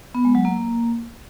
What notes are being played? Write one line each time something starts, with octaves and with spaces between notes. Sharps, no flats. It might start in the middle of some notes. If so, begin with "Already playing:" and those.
B3
G#3
F#3
A#3